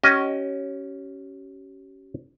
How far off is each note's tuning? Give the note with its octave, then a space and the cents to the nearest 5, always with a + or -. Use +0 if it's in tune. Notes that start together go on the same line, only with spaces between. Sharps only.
C#4 +0 G4 -40 D#5 +5